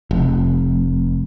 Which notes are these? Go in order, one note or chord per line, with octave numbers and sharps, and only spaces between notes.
F1